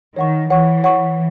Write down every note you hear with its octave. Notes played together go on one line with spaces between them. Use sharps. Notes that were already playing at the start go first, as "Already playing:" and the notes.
D#3 C#5 F#5 C#6
E3 C#5 F#5 C#6
C#5 F#5 C#6